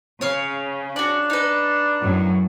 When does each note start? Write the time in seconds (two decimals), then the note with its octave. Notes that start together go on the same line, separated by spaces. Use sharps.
0.21 C#3 C#5 F5
0.96 D4 F#4 D5
1.30 D#4 B4
2.01 F#2 A2 F#3